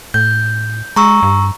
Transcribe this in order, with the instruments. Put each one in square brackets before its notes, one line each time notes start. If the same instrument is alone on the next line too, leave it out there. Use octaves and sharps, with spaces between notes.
[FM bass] A2 [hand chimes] G6
[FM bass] G#3 [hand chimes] A#5 C#6 E6
[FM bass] G2